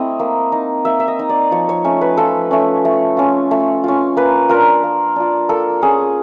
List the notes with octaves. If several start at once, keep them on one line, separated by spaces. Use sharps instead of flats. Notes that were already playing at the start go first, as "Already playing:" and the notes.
Already playing: A3 C4 E4 D#5
A#3
D#4
A#3 E5
E5
D#5
D#4
D5
F3 C#5
C#5
A3 C#4
B4
F3 A4
A3 C#4
A3
C#4 F4
A3
C#4 F4
A#3 B4
D4 F4 A#4
A#3
D4 F4
A#3 A4
C#4 F4 G#4